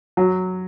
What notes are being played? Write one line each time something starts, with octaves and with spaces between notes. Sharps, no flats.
F#3